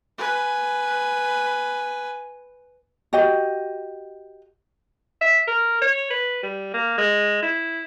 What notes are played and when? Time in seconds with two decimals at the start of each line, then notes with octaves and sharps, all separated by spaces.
0.18 B4 G#5
3.13 F#4 G4 D#5
5.21 E5
5.48 A#4
5.81 C#5
6.10 B4
6.43 G3
6.74 A#3
6.98 G#3
7.42 E4